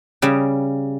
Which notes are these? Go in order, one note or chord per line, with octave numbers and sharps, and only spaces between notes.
C#3 G3